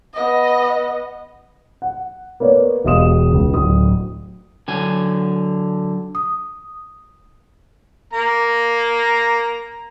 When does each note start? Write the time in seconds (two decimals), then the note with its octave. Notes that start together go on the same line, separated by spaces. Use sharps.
0.14 B3 D#5
1.82 F#5
2.40 A#3 B3 C#5 D5
2.84 E1 G4 D#5 F5 D#6 E7
3.32 C#2
3.54 D1 D#6
4.68 D3 F#3 G#5
6.15 D#6
8.13 A#3 A#5